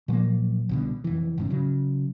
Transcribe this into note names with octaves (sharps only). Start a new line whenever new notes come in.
A#2 F3 F#3 A#3
C2 B2 D3
F1 E3
G#1 G#2 C#3
C#3 F#3